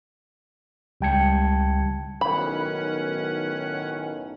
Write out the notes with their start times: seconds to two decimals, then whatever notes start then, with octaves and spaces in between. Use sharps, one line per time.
1.01 C#2 G3 G5 A5 G#6 C#7
2.21 B1 A2 D#3 C#4 F#5 B5